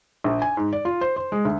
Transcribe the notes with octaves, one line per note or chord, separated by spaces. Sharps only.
A#1
G#5
G#2
D5
F4
C5
C5
G#3
D2